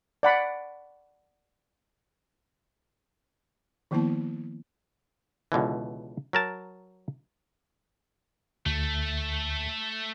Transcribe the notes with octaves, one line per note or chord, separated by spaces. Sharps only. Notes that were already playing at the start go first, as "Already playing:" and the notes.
D5 F#5 B5
D#3 F3 A#3 B3 E4 A5
C#2 B2 D3 E3
F#3 A#4 A5
D2 A3